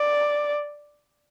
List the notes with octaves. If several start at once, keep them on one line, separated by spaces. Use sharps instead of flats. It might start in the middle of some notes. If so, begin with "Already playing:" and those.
Already playing: D5